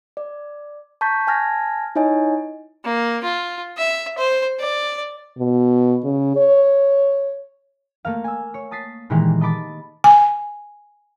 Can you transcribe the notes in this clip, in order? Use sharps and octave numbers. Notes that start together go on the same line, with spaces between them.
D5
A5 A#5 C#6 G6 B6
G#5 A5 F6 G#6 A#6
D#4 E4 C#5 D#5 G#5
A#3
F4
E5
C5
D5
B2
C#3
C#5
A3 A#3 F5
G#5 E6
C#5
A5 D#6 A6 B6 C7
A#2 D#3 E3 G#3 A#3 G4
D#5 A5 B5 D6 A6
G#5